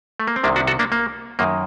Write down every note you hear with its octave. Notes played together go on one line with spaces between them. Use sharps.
A3
A#3
C4
C2 C3 D#3 A#3 D4
D4 F#4
F#4 A4
A#3 D4
A#3
F#2 D#3 A#3